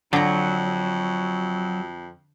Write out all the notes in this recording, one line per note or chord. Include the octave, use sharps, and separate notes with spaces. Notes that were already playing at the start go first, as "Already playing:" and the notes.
F2 D3 F#3 A#5